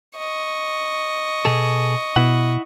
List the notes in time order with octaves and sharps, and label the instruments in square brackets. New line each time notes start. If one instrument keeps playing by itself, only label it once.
[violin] D#5 C#6
[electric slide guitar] B2 G#4 A4
[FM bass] B2 [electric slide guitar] E4 F#5